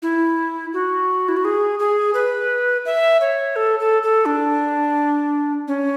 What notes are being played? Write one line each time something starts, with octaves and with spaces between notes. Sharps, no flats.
E4
F#4
E4
F#4
G#4
G#4
B4
E5
C#5
A4
A4
A4
D4
C#4